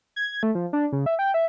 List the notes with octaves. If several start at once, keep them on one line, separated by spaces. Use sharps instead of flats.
G#6
A3
F3
D4
C#3
E5
G5
E5